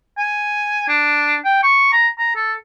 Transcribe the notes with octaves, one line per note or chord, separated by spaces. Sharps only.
G#5
D4
G5
C#6
A#5
A#5
A4